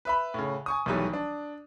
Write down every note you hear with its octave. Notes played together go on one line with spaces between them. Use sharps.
B4 E5 B5
A2 C#3
G#5 C#6 D#6
B1 D#3 E3 F#3 G3 A3
D4